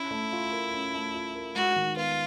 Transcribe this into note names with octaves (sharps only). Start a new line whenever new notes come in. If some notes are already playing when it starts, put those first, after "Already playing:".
Already playing: C#4 E4
A3
F4
A#4
C#4
A3
F4
A#4
G#3 F#4
D#3
B3 F4